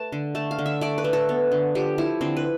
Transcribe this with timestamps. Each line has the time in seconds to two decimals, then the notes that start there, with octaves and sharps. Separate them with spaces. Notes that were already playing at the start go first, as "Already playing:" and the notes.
Already playing: A3 B4 A5
0.12 D3
0.35 A3 A5
0.51 F5
0.59 D3
0.66 E5
0.81 A3 D5
0.98 B4
1.04 A3
1.13 A4
1.29 B3
1.52 D3
1.75 F3 G4
1.98 F3 E4
2.21 D3 C4
2.37 B4